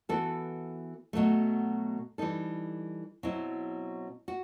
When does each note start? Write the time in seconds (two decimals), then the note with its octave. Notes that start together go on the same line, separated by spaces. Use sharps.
0.09 E3 B3 F#4 A4
1.13 B2 F#3 A3
2.18 E3 G3 D#4 A4
3.23 B2 F#3 C4 E4
4.28 F#4